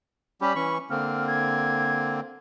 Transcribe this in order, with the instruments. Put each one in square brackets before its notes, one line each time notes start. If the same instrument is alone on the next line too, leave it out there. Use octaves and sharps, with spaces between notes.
[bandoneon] G3 C#4 G4 [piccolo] B5
[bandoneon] E3 C#4 C#6
[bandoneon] D3 A#3 C4 [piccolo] F6
[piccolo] G#6